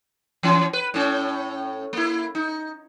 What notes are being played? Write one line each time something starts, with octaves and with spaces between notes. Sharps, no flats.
E3 C#4
B4
A2 C#4
A#3 E4
D#4